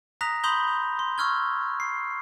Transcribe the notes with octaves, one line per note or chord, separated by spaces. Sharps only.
A#5 D#6 F#6 A#6 B6 F7
B5 C6 D#6 G6 F7 G7
C6
C#6 E6 F6 G#6 G7
C7